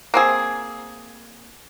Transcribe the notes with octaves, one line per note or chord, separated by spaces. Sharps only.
A#3 C4 G#4